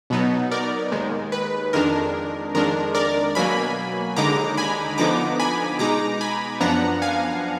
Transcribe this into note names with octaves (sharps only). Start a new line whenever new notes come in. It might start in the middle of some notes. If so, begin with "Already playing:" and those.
B2 F#3 B3 D#4
A#4 D5
D#2 D#3 G#3
B4
F2 D#3 G#3 D4 A#4
F2 D#3 G#3 D4 A#4
A#4 D5
B2 F#3 A#3 G#5 B5
D#2 D3 G#3 D#4 A#5 D6
G#5 B5
D3 F3 B3 D#4 A#5 D6
G#5 B5
B2 G#3 D#4 A#5 D6
G#5 B5
F#2 F3 B3 D4 F#5 A#5
F5 G#5